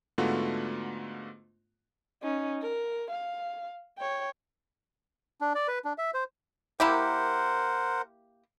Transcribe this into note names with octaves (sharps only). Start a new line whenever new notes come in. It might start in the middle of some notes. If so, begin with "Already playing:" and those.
G#2 D3 A3 B3 F4 F#4
C#4 D#4
A#4
F5
C#5 G5
D4
D5
B4
D4
E5
C5
A#3 E4 G4 A#4 C5 F#5